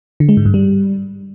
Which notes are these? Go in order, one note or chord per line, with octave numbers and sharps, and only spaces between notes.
D3
G#3
G#2
G2
G3